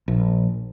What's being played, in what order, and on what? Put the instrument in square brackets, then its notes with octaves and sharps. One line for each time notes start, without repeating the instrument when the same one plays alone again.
[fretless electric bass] A#1